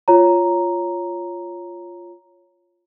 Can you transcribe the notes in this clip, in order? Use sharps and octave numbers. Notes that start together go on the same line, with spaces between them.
F4 C#5 A#5